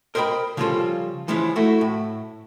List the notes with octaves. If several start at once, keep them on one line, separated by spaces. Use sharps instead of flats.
A#4 C5 D#5 E5 G5 B5
C#3 F3 G3 C#4 F4 A4
E3 F3 G#3 C#4 E4
A3 E4 F#4
A2